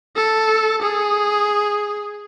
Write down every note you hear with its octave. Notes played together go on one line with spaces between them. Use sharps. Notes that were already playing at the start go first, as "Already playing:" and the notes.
A4
G#4